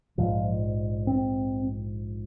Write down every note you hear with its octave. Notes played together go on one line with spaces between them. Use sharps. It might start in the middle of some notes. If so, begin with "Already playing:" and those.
A#1 G#2 F3
C4